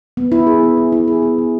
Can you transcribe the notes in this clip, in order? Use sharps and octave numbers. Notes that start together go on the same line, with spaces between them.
B3
E4
G#4
B3
B3
E4
G#4
B3
B3